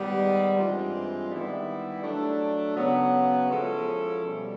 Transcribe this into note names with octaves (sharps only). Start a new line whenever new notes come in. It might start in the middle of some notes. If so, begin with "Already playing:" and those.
Already playing: G#2 D#3 G3 B3
G2 E3 G#3 C4 F4
D#3 G3 B3 E4
F#3 A3 D4
C#3 F#3 B3
F3 G#3 C#4 E4 A4
B2 G3